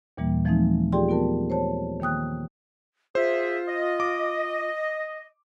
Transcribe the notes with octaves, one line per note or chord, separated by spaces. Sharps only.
D#2 A#2 E3 G3 A#3
E3 F3 G#3 A3 C4 D#4
F4 G4 G#4 D5 G5 C6
B3 F4 A#4 A5
C5 C#5 A5
D#3 A#3 G5 D#6 F#6
F4 G#4 C5 E5
D#5
D6